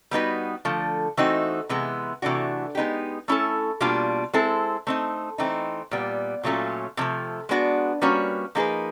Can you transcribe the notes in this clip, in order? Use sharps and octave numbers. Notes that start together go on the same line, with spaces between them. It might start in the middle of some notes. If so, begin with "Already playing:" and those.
G3 B3 D#4 F#4 B4
D3 F3 A3
E3 A3 C4 D#4 F#4
C3 E3 G#3 B3
C3 E3 A3 D4 F#4
G#3 B3 D#4 G4
A3 C#4 E4 A4
B2 G3 A#3 D4 F4
G#3 C4 E4 A4
A3 C4 D#4
E3 A3 C4 D#4
A#2 G3 B3
A#2 F#3 A3 C#4 F4
C3 F3 A3
G#3 B3 D4 F#4
G3 A#3 C#4 F#4 B4
F3 A#3 D#4 G#4 B4